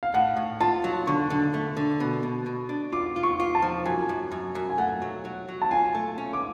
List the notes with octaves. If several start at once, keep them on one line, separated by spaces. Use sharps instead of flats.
F5
A2 F#5
A2
F4 A5
F#3
D3 C#6
D3
A3
D3
B2
B2
B2
D4
F4 D6
F4
C#6
F4
A5
F3
F#2 G#5
F#2
F#2
F#2
G#5
A3 F#5
F#3
F#3
F#3
A5
F4 G#5
A3
C#4
D6